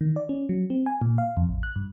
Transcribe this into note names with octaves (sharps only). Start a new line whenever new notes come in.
D#3
D5
C#4
F#3
C4
G#5
A#2
F5
F2
A1
F#6
G2